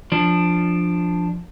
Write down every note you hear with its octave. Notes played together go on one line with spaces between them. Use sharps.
F3 D4